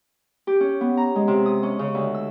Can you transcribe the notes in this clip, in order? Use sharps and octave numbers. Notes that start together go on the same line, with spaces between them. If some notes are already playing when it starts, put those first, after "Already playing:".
G4
C#4
B3
A#5
G#3
C3
D#6
C#4
C#3
D2
E6